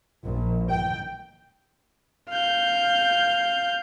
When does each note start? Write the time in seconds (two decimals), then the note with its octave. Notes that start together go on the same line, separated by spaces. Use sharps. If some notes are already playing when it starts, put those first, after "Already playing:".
0.24 A#1
0.70 G5
2.29 F5 G6